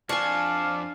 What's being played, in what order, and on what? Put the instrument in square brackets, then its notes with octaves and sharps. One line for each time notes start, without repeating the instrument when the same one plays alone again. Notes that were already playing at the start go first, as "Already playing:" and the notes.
[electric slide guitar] F2 F4 [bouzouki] D4 [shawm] F5 [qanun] G#5 C#6